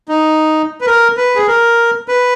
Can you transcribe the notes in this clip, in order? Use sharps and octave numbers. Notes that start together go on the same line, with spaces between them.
D#4
B4
A#4
B4
G#4
A#4
B4